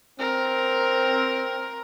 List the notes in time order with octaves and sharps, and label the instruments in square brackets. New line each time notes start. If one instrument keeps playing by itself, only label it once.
[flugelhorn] C4 [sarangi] A#4